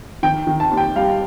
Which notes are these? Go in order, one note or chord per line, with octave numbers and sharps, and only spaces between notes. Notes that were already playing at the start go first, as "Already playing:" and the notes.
D#3 G5
D#3
A5
D#2
G5
G3 F5